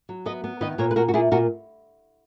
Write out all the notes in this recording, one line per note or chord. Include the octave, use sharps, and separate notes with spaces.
F#3
B3 B4 D#5
B3
D#3 B4 D#5
A#2 A#4 C#5
B4
A#2 F#4 A#4
F#4
A#2 E4 G#4
A#2 F#4 A#4